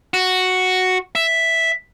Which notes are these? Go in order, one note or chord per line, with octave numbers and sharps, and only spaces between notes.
F#4
E5